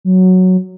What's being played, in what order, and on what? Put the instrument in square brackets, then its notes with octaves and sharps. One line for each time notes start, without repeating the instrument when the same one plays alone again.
[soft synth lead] F#3